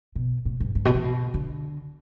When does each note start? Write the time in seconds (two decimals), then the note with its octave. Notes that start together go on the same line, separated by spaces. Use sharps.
0.16 B2
0.45 A2
0.60 G2
0.75 G2
0.85 B2
0.95 E3
1.04 B2
1.34 D3